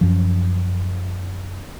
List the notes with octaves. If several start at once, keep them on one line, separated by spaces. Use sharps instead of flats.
F#2 F3